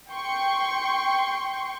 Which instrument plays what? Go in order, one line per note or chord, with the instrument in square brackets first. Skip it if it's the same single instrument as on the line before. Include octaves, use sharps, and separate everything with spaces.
[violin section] G5 C6 C#6